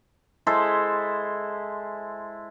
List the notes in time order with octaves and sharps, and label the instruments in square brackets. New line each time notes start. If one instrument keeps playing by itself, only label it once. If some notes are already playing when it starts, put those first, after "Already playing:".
[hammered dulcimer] G#3 E4 A4 C5